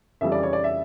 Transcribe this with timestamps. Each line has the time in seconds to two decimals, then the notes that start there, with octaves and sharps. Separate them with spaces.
0.21 F2 C#3 E3 G3 E5
0.32 D5
0.43 C#5
0.53 D5
0.64 E5